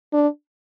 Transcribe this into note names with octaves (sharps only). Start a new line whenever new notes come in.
D4